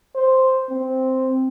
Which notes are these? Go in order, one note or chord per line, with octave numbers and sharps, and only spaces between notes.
C5
C4